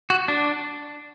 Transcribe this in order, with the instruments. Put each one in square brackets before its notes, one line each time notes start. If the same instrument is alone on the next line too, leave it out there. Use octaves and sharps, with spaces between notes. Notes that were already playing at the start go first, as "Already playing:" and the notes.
[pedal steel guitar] F#4
D4